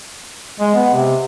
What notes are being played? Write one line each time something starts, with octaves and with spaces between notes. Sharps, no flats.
G#3
B3
C3